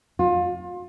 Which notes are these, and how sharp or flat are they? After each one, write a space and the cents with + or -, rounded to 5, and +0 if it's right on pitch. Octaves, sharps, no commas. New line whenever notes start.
F4 +25